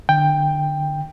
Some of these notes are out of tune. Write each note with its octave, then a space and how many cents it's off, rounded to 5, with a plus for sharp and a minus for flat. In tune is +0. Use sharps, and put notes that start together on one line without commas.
D3 +30 G5 +10